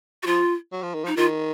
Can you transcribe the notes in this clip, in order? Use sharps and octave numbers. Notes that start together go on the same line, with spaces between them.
F#4
F3 F4
F#3
F3
D#3
F3
D#4
D#3 F4